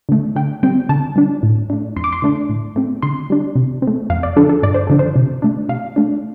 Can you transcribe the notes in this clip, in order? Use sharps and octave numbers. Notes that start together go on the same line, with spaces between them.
D3 A3
D3 G5
G3 C4 G5
D3 A5
G3 D4
A2
A3 D4
F2 C6
D6
C6
D3 A3 D4
A2
A3 C4
D3 C6
G3 D4
C3
C4
A3
F2 F5
D5
D3 F3 D4 A4
A4
G2 D5
C5
D3 F3 D4 A4
C5
C3
A3 D4
C3 F5
A3 D4